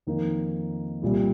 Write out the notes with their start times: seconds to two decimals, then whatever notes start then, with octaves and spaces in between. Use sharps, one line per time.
0.07 F2 D#3 A#3 D#4
1.02 C2 A#2 G3